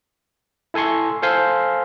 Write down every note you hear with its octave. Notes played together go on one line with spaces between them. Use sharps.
E4 A4 G#5 C6 C#6
A4 C5 F5 G#5 C6